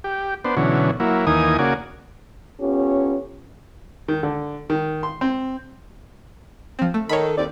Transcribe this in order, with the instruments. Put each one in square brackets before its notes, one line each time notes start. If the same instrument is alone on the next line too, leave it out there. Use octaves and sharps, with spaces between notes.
[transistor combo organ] G4
B3 D4 C5
B2 D3 E3 F#3 C#4
F#3 A#3 E4
D#2 E3 A#3 D#4 G#5 D#6
C#3 A#3 F#4 D5 G#5
[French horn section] B3 C#4 F4 G4 A4 C#5
[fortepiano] D#3
D3
D#3
C6
C4
[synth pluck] F3 C4
A3
[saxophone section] D#3 A4 [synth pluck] C#5 B5
[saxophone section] D#2 C4 D5